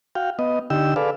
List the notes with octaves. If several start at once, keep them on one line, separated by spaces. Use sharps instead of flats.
F#4 F5 G5
B3 D#5
D3 D#4 G4 G5 E6
G#4 A4 B4 D5 F5